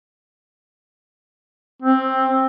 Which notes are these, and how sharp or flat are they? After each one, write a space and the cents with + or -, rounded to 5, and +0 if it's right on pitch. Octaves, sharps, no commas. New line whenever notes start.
C4 +10